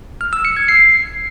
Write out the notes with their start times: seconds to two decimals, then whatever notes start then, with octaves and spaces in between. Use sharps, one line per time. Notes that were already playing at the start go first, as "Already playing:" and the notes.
0.21 F6
0.33 E6
0.45 C#7
0.57 G#6
0.68 C7